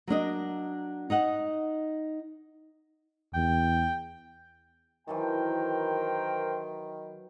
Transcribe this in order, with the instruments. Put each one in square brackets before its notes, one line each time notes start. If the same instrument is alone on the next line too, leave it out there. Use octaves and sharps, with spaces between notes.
[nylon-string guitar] F#3 A#3 D4 D#5
D#4 D#5 F#5
[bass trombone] E2 [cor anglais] G5
[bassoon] D#3 [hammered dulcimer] E3 F#3 A5 [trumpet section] A#4 C5 G5